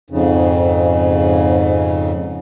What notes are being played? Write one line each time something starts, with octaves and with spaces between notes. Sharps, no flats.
F2 G#2 C#3